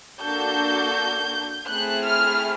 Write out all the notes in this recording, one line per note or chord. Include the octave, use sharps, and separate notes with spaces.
A#3 D4 F#4 A4 G6
A3 C4 E4 G#4 F#6
F6